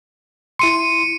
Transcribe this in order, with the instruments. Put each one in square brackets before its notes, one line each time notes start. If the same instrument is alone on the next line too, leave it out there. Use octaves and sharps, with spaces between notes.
[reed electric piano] E4 C6 [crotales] C#7 D#7